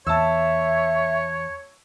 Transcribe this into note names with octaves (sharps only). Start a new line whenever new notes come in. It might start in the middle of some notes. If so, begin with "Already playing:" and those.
E2 C#5 E5 A5 E6